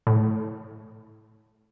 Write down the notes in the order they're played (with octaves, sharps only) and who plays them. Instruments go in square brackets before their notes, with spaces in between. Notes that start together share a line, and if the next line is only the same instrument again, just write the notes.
[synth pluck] A2